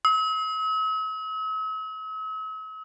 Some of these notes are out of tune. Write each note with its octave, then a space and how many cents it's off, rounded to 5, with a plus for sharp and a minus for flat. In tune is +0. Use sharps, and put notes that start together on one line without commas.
E6 -45